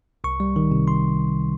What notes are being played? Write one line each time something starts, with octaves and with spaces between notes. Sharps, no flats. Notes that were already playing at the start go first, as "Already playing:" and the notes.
C2 C#6
G3
D#3
C3
C6